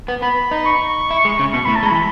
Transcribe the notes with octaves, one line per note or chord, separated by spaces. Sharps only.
B3
B3 B5
D#4
C#6
E4
G#3
C#3
B2 C#6
A2 B5
A5
G#3
E3 B5